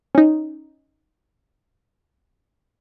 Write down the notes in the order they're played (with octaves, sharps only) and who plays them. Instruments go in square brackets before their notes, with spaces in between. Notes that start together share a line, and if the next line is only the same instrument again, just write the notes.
[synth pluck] C#4 D#4